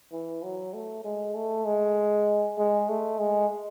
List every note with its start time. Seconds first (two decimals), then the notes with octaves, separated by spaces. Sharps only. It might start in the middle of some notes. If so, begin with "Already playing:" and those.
0.12 E3
0.43 F#3
0.73 A3
1.04 G#3
1.35 A3
1.65 G#3
2.57 G#3
2.88 A3
3.19 G#3